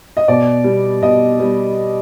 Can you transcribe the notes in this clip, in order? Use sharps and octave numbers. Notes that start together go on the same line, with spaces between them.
D#5
B2 D5
G3 B3
B2 D#5
G3 B3